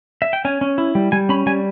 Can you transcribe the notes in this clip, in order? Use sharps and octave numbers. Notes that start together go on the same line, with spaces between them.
E5
G5
C#4 G#5
C#4
E4
G3
G3 G#5
C#4 B5
G3 G#5